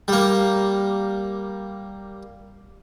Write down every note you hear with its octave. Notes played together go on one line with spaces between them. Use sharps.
G3 A#3